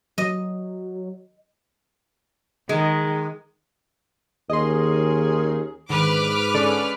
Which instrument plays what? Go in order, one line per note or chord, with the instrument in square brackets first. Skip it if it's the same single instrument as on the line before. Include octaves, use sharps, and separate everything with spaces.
[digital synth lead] F#3 [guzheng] D#5
[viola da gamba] D#3 [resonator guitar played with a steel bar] G#3
[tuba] D#2 [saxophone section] D#3 C#4 G#4 [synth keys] D#5 C6
[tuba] G#2 [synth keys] D3 D#3 [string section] B4 D6 F6
[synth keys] D3 A4 D5 [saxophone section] G#3 C#4